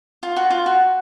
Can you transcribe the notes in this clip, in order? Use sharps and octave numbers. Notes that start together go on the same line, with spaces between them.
F4
F#4
F4
F#4